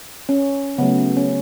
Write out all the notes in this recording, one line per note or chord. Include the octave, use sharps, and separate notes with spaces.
C#4
C#3 F#3 A3 B3
C#4